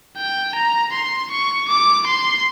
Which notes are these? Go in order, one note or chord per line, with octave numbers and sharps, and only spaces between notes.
G5
A#5
C6
C#6
D6
C6